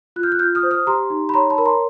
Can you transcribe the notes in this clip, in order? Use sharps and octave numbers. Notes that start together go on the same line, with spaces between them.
F4 F#6
F6 G6
F#6
F4 F6 G6
D#6 F6
C5
D#6 F6
G4 A#5 C6
D#4
B5
C#5 A#5 C6
A5 B5
A#4
A#5 C6